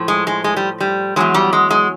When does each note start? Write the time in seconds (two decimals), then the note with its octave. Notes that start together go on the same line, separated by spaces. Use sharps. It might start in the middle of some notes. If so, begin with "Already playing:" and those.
Already playing: A2 F3
0.08 G#3
0.27 G#3
0.44 G#3
0.56 G3
0.80 G3
1.16 E2 B2 F#3 G#3
1.34 G3
1.53 G#3
1.70 G#3